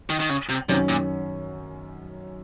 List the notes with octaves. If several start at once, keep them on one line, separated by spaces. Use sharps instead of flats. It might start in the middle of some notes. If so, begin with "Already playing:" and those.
D#3
D#3
C#3
C3
F#2 C3 D#3 F#3 C#4
A#2